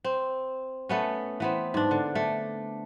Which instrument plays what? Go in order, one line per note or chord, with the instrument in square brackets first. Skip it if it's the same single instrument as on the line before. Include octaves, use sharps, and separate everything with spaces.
[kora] C4
A3 B3 C#4
E3 B3 C4
G#2 D4
D3
A3